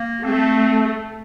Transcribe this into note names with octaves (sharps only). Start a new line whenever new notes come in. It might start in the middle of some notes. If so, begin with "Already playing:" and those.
Already playing: A#3
A3 C4